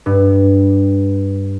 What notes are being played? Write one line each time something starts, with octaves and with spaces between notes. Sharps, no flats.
G2